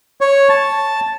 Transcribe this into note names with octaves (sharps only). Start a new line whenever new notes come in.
C#5
A5